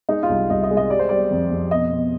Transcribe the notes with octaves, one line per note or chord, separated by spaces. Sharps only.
G#3 D#4
F4
C2
C2 D#5
D#5
G#3
D#5
G3 D5
C5
G3 D5
F2
F2
B2 D#5
B2